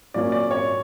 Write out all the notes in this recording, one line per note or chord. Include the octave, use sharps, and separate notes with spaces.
A#2 F#3 A#3 C#4 D5
D5
C#5